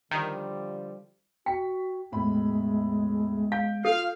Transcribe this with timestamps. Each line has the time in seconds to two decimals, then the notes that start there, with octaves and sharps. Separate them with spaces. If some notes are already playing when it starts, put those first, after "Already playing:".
0.11 D3 D#3 F3 G3
1.46 F#4 G5 B6
2.12 E1 A2 G#3 B5
3.52 F5 G6 D7
3.85 F4 A4 F5